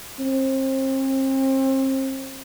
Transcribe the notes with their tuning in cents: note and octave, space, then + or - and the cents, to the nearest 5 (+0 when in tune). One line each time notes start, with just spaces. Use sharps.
C4 +35